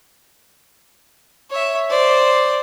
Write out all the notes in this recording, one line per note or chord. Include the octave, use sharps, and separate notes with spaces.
C#5 E5
C5 D5